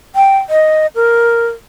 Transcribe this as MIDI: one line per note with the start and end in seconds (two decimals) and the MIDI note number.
0.16 0.38 79
0.49 0.87 75
0.95 1.47 70